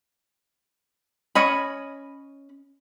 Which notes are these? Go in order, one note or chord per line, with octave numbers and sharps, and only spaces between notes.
C#4 C#5 D#5 B5